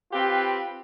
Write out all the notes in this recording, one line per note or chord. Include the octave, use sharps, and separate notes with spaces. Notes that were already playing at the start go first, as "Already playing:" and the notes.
C4 F4 G4 B4